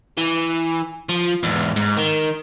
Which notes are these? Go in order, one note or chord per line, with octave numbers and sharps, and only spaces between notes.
E3
F3
E2 G#2
G#2
D#3